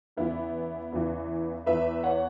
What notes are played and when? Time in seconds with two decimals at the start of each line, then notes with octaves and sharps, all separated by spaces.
0.17 E2 C#3 E3 B3 E4
0.92 E2 C#3 E3
1.66 E2 E3 B4 E5
2.03 C#5 F#5